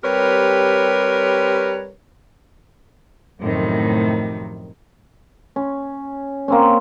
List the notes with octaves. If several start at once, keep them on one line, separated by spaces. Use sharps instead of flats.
G3 C4 G4 A#4 B4 C#5
F#2 A2 C3 D#3 F3
C#4
A#3 C4 C#4